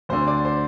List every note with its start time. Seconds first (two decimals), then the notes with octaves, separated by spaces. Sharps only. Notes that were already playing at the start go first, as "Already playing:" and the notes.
0.09 D2 D3 C5
0.28 D5
0.45 C5